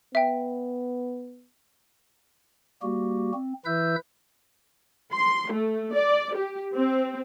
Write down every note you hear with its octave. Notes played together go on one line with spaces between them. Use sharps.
B3 E5 G5
G3 A#3 F#4 G4
C4
E3 E4 B4 E5 E6 G6
C6
A3
D5
G4
C4